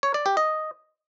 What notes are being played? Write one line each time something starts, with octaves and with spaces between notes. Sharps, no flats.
C#5
D5
G4
D#5